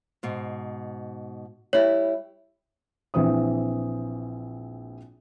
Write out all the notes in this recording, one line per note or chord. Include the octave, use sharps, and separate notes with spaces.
G#2 B2
G3 E4 G4 C#5
A#1 E3 C4 D#6